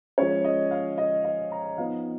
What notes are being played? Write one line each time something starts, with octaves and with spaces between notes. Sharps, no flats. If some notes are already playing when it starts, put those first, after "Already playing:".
F3 G#3 C#4 C#5
D#5
F5
D#5
D#5
A#5
F3 B3 D#4 F5